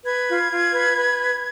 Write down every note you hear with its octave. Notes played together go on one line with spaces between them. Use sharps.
B4 G#6
F4
F4
B4
B4